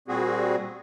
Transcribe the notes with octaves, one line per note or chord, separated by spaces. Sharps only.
A#2 G3 C4 F#4 G#4